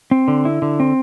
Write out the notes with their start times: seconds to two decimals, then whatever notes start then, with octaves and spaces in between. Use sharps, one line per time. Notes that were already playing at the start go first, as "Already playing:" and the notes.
0.11 C4
0.28 D3
0.45 E4
0.62 D3
0.80 C4